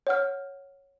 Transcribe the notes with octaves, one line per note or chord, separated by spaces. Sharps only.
C#5 F#5 F6